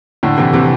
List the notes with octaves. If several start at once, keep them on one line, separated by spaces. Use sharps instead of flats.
A2 D3
C3 E3
C3 E3